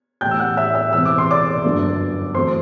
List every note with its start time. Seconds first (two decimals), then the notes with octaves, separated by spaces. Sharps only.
0.21 A1 A2 G3 G5 G6
0.31 E6
0.39 F#5 F#6
0.57 E5 E6
0.75 E5 E6
0.93 E1 E2 C3 E6
1.06 D6
1.18 C6
1.31 D5 D6
1.64 G1 F#2 D3
2.35 E2 C3 F#3 A3 C5 C6